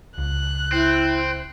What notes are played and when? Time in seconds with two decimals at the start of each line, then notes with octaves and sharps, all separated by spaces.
0.18 C#2 F#6
0.72 C4 E4